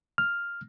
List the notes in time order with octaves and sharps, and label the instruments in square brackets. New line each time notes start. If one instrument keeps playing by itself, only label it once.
[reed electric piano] F6